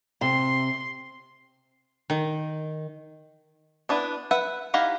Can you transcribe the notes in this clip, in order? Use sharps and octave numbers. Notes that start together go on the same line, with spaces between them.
C3 C6
D#3
B3 D4 E4 B4
B4 E5 F#5
D#4 E4 G4 F5 F#5